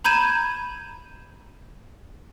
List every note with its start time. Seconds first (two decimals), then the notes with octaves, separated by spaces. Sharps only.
0.04 A#5 B5 G6 G#6 D#7 E7